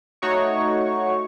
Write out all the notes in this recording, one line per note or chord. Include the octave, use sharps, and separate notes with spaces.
A3 D#4 F#4 C#5 C#6